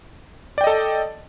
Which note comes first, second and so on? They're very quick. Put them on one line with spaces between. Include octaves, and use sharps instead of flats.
D5 G5 D#5 A4 A5